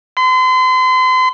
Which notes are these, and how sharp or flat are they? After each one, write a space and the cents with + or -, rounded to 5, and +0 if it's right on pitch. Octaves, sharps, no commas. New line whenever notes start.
C6 -40